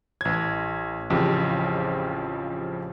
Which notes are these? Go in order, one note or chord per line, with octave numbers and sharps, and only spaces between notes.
A1 G#6
A1 F2 C#3 F3 G4 C5